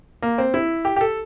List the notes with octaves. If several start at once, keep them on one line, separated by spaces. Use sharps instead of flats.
A#3
C4
E4
G4
G4
A4